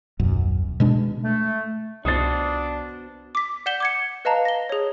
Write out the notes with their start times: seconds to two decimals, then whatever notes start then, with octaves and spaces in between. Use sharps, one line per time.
0.19 D#1 B1 F#2
0.80 B2 G#3 D4
1.24 A3
2.05 C2 B3 D4 F#4 C5 D#6 A6
3.35 D6 B6
3.66 D5 F#5 G6 B6 E7 G7
3.80 D6 G#6 C#7
4.25 B4 D#5 F5 A5 A#5
4.45 A#6 G7
4.70 G#4 C#5